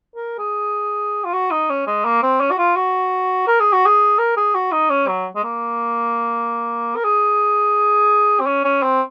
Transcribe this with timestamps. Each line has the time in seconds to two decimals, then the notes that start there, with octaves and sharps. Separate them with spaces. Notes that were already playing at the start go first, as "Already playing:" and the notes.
0.15 A#4
0.39 G#4
1.25 F4
1.33 F#4
1.51 D#4
1.70 C#4
1.87 G#3
2.05 A#3
2.23 C4
2.40 C#4
2.51 F#4
2.58 F4
2.76 F#4
3.47 A#4
3.60 G#4
3.73 F#4
3.86 G#4
4.19 A#4
4.37 G#4
4.55 F#4
4.72 D#4
4.90 C#4
5.08 F#3
5.36 G#3
5.44 A#3
6.96 A#4
7.04 G#4
8.40 C4
8.46 C#4
8.65 C#4
8.83 C4